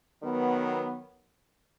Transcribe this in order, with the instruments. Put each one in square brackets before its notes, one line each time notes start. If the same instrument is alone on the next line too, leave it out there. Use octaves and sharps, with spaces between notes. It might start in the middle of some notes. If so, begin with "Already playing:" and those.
[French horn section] D#3 F#3 B3